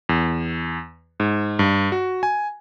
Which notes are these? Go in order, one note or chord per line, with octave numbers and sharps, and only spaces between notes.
E2
G#2
G2
F#4
G#5